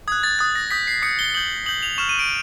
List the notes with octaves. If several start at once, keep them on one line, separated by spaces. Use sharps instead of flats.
D#6 F#6 G#6
A6
D#6 F#6 A6
A#6
D#6 G6 B6
C7
D#6 G6 C#7
G7
D#6 G6 F#7
D#6 G6 F#7
F7
C#6 F6 E7
D#7
D7